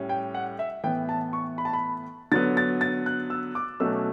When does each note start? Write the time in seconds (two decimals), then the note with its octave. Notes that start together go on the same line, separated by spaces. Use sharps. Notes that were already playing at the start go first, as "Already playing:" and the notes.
Already playing: A2 G3 C#4
0.09 G5
0.34 F#5
0.59 E5
0.84 A2 E3 B3 G5
1.09 A5
1.33 C#6
1.58 B5
1.65 A5
1.73 B5
2.31 D3 F#3 B3 A6
2.57 A6
2.81 A6
3.06 F#6
3.30 E6
3.55 D6
3.80 B2 F#3 A3 C#4 E6